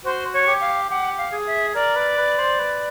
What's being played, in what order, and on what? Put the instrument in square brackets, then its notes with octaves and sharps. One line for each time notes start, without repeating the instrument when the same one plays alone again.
[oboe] F#4 [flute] C5
[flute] C#5
[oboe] G4
[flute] F5
[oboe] G4 [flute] F#5
[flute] F5
[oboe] G#4
[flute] E5
[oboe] A#4 [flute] D5
[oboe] B4
B4
C5
B4